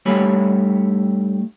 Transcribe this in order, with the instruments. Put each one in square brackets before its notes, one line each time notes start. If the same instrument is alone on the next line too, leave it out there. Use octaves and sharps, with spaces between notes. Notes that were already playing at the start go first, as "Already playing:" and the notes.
[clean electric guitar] G2 A3 G4 C#5 G#5 B5